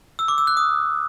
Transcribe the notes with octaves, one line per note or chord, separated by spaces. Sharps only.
E6
D6
E6
F#6
D#6